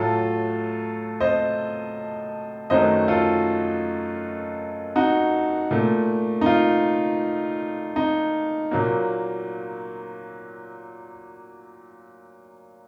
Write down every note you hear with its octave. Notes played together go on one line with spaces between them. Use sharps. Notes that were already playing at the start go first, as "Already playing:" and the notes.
Already playing: A2 F#3 A3 F4 A4
C5 D#5
F#2 D#3 F#3 A3 C5 D#5
F4 A4
D#4 F#4
A#2 A3
D#4
F4
D#4
A#2 F#3 A#3